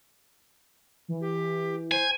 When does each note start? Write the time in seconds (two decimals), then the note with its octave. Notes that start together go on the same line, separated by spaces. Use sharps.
1.08 E3
1.21 G4
1.91 C5 G#5